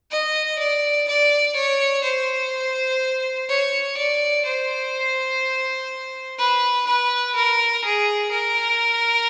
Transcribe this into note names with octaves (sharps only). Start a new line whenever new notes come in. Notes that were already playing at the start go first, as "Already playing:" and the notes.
D#5
D5
D5
C#5
C5
C#5
D5
C5
B4
B4
A#4
G#4
A#4